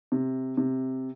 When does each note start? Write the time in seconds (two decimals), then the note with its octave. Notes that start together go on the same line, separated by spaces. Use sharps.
0.12 C3
0.57 C3